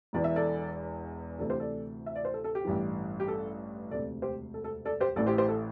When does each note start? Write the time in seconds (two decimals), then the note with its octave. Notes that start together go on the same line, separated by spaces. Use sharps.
0.13 E1 E2 E3 D5
0.24 E5
0.36 A4 D5
1.39 D2 C3 E3 A4 D5
1.50 G4 C5
1.60 A4 D5
2.06 E5
2.16 D5
2.25 C5
2.34 A4
2.44 A4
2.55 G4
2.65 A1 G2 E3
3.20 G4
3.28 A4
3.91 E1 D2 C3 A4 D5
4.22 G4 C5
4.54 A4
4.64 A4
4.85 A4 D5
5.00 G4 C5
5.16 A1 A2 E3 A4 D5
5.27 G4 C5
5.38 G4 C5
5.48 A4